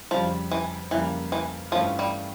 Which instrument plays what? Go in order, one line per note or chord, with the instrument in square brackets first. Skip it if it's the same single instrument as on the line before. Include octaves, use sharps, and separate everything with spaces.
[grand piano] F2 C#3 G3 [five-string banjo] F3
[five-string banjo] E3
[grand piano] F2 C#3 G3 A#3 [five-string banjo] E3
[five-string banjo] E3
[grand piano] G2 E3 A3 C#4 F4 [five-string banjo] F3
[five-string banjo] G3